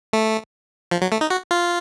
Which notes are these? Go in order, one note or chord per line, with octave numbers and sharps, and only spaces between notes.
A3
F3
F#3
A3
D#4
F#4
F4